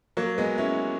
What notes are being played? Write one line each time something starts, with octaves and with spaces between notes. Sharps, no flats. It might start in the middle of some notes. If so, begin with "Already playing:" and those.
F#3 A#3
G#3 B3
C#4 E4